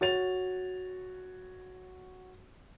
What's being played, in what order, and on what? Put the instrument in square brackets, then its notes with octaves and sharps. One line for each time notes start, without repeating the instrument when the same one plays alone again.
[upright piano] F#4 C#5 A6 F7